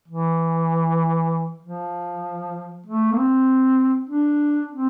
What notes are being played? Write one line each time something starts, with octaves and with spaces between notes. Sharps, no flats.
E3
F3
A3
A#3
C4
D4
C4